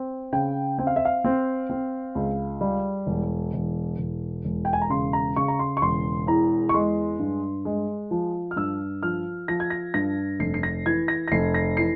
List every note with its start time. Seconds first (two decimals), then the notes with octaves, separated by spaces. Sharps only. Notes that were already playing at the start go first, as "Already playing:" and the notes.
Already playing: C4
0.32 C#3 G5
0.78 C4 G5
0.87 F5
0.96 E5
1.05 F5
1.24 C4
1.70 C4
2.15 C#2
2.61 G3
3.07 E1
3.54 E1
3.98 E1
4.45 E1
4.65 G5
4.73 G#5
4.82 A#5
4.90 C#3 C6
5.13 A#5
5.36 C#3 C#6
5.48 A#5
5.59 C6
5.77 C#6
5.82 E1 C6
6.27 E2 A#5
6.69 C#6
6.74 G#3 C6
7.19 G2
7.65 G#3
8.11 F3
8.51 F6
8.56 G2 E6
9.03 F3 F6
9.48 F3 A#6
9.60 G#6
9.70 A#6
9.94 G2 A#6
10.40 F1 C7
10.54 C7
10.63 A#6
10.86 E3 G#6
11.08 A#6
11.28 A#6
11.32 F1 C7
11.54 A#6
11.77 E3 C7